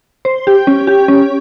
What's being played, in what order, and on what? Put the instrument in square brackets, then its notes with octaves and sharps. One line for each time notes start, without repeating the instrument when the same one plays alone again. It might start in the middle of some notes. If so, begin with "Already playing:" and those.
[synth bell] C5
G4
C#4
G4
C#4